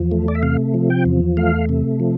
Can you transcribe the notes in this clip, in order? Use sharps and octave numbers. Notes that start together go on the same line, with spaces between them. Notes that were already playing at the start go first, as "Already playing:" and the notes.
Already playing: E2 F3
A3
D5
E5
C3 F5
F3
G5
E2
A3 F5
C3
F3